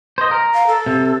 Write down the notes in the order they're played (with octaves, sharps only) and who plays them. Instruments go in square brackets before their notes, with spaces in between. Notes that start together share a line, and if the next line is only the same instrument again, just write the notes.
[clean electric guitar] C5 D#5
A#4
[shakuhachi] F5
A4
[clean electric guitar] C3